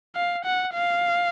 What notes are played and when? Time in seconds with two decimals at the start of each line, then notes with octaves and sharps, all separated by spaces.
0.16 F5
0.45 F#5
0.74 F5